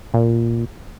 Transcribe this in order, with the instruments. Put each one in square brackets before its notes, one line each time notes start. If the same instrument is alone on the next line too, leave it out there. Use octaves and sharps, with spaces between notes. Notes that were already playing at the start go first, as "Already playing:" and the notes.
[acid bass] A#2